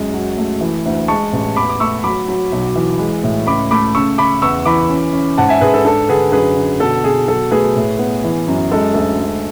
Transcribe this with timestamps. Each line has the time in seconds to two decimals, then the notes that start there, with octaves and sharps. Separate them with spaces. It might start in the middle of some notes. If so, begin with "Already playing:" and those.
Already playing: F#2 G#3
0.14 F#3
0.38 A3
0.61 E3
0.86 D2
1.08 G#3 A5 C#6
1.33 A1
1.56 E2 B5 D6
1.69 D6
1.80 A3 C#6 E6
2.04 F#3 B5 D6
2.28 F#3
2.52 B1
2.76 E3
2.99 G#3
3.23 A2
3.47 C#2 B5 D6
3.71 A3 B5 D6
3.95 C#3 C#6 E6
4.18 C#3 B5 D6
4.42 E2 C#6 E6
4.65 E3 B5 D6
4.89 C#4
5.13 C#4
5.38 G#2 F#5 A5
5.49 E5 G#5
5.61 G#2 G#4 B4
5.74 A4
5.85 D4 A4
6.09 D3 G#4 B4
6.32 F#2 G#4 B4
6.57 D3
6.80 B2 A4
7.04 B2 G#4
7.28 F#3 A4
7.51 A3 G#4 B4
7.76 A2
7.99 B3
8.24 E3
8.48 F#2
8.71 G#3 A4
8.94 D2 A4
9.18 G#3